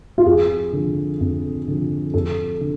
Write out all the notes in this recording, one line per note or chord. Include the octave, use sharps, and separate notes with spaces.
F4
F2 G#4
D3 F3
F2
D3 F3
F2 A4
D3